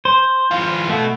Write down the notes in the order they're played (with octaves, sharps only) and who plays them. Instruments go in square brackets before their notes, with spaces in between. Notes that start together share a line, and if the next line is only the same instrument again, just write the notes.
[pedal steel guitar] C5
[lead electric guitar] E3 F4
[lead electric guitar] B2 [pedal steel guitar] A3